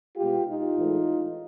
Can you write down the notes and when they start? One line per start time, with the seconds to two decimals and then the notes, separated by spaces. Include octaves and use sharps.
0.16 B2 G#3 F4 G4
0.46 D#4 F4
0.76 A2 E3 G#3